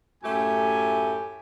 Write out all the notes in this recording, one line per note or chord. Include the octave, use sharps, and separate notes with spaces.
F#2 A2 A3 G4 G#5